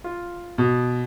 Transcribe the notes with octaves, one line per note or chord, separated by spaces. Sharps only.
F4
B2